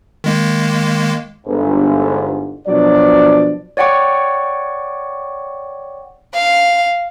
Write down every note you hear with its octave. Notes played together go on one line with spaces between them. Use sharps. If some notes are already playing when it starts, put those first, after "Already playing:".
D#3 G#3 A#3
G1 G#2
B2 F3 F#3 D4 D5
C#5 D5 F#5 G5 C#6 D6
F5